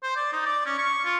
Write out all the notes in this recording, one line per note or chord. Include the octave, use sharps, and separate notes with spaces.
C5
D5
D#4
D5
C#4
C#6
F4